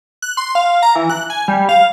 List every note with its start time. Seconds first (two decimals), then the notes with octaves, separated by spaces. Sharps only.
0.22 F#6
0.37 C6
0.55 F5
0.83 A#5
0.95 E3
1.10 F#6
1.30 G#5
1.48 G3
1.69 F5